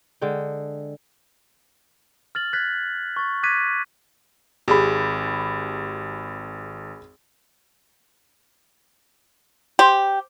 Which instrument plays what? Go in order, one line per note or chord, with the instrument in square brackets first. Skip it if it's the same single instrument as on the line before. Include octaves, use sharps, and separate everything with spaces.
[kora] D3 G#3 G5
[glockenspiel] F6 A6 F#7
F#6 G#6 A6 B6
C#6 A6
D6 F#6 G#6 A6 B6 D#7
[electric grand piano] G#1 [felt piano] G4 G#4 B5
[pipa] G4 [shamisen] C5